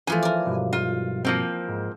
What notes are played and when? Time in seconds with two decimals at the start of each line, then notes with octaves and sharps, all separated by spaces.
0.07 E3 F3 A3 G#5
0.23 A#4 D5
0.46 B1 G2
0.73 F4
1.25 F3 A#3 C4
1.68 G#2